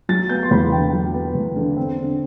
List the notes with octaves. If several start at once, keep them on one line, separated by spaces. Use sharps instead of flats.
F#3 A6
B3 G6
C6
E2 B5
D3 G5
F#3
B3
E2
D3
C4
D3